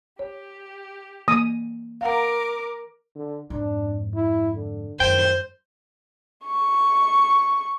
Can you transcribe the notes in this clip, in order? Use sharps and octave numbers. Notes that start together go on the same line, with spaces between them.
G4 C#5
E3 A#3 D#6
A#4 F5 F#5 A#5 D6
D3
F2 G#2 D4
E4
D3
F#2 D#3 C5 G5
C#6